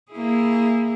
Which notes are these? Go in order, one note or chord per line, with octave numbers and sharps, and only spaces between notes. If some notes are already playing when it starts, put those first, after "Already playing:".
A#3 E4 G#4